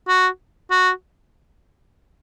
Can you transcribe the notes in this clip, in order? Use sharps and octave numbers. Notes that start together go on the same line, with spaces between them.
F#4
F#4